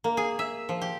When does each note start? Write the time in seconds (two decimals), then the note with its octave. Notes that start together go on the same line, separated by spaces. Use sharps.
0.04 A#3
0.17 G#4
0.39 E5
0.69 F3
0.82 G4